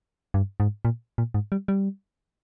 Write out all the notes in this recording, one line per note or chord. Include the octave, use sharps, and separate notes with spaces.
G2
G#2
A#2
A#2
G#2
G3
G3